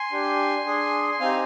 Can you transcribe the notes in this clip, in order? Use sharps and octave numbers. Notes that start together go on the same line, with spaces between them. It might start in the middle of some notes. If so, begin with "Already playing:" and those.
Already playing: G#5 C6
D4 G4
D4 G#4
C4 D#4 G4 F5 G#5